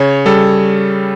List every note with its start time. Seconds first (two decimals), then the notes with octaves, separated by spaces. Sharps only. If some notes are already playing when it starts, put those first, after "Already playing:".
Already playing: C#3 C#5
0.26 G3 A4